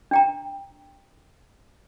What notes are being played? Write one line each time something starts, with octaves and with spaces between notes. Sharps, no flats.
D4 G5 A#5